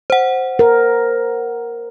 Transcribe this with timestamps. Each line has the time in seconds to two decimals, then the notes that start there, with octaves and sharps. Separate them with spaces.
0.10 C5 F#5
0.59 A#4